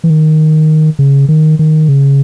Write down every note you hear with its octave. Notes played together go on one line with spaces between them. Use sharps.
E3
D#3
C#3
D#3
D#3
C#3